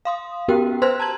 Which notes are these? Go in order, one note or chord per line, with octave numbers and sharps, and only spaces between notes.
F5 C6 D#6
B3 C#4 F#4 G4 A#4 G5
B4 C5 C6 E6 F#6 G#6
A5 A#5 G#6 F#7